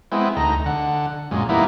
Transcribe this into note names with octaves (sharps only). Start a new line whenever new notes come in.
G#3 B3 C4 E4
D2 D#4 A#5
D3 F#5
F#2 A#2 G#3
E3 G3 A#3 B3 D#4 E4